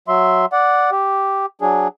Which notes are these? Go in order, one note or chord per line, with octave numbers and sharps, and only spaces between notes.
F#3 E5 C6
D5 F#5
G4
F#3 D4 G#4